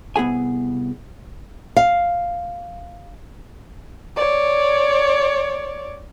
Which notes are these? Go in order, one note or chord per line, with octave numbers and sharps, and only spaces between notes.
C2 B3 E4 G#4 G#5
F5
C#5 D5